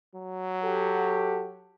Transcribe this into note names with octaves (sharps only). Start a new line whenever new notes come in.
F#3
F#4 G4 A4